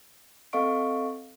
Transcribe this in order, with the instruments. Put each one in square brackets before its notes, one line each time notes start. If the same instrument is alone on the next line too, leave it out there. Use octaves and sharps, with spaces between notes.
[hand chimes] C4 A4 D#5 F5 C#6 D7